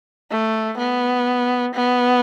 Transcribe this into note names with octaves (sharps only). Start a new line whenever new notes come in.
A3
B3
B3